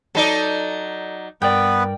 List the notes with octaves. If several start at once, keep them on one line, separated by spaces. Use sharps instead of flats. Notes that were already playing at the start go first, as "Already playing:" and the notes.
F#3 D#4 A4 D5
G2 B3 A#4 B4 D5 G5